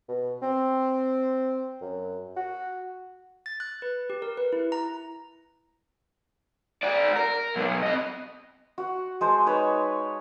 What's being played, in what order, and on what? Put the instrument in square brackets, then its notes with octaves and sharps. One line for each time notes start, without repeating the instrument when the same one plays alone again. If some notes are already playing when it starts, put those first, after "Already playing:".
[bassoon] B2
C4
F#2
F#4
[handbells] A6
F#6
B4
G4
A#4
B4
E4
A#5
[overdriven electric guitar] F#4 D5
A#4
B2 F#3
C4 D#5
[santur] F#4 F#5
G#3 C5 A5
D#4 B4 C#5